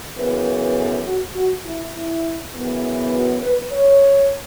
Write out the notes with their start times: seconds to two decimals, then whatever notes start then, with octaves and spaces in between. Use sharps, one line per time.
0.16 F#2 C#3 E3 B3 B4
0.76 A4
1.05 F#4
1.35 F#4
1.64 E4
1.95 E4
2.54 F#2 C#3 E3 B3
3.13 F#4
3.42 B4
3.72 C#5